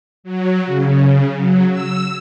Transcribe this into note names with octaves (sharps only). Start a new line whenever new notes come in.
F#3
C#3
F#3
E6